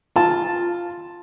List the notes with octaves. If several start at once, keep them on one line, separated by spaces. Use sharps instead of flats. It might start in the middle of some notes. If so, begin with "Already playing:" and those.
F4 A5